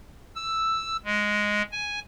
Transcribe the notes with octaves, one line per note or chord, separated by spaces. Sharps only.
E6
G#3
G#5